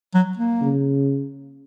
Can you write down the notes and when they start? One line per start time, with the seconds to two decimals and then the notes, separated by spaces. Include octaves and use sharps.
0.14 F#3
0.37 A#3
0.61 C#3